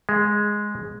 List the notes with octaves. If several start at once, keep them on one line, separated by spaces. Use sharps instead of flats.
G#3